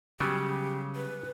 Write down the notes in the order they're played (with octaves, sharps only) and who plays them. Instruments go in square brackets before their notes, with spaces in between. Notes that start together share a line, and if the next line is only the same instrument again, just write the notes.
[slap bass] C#3 [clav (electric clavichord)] F#3 G3 B3 [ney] G4
[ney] B4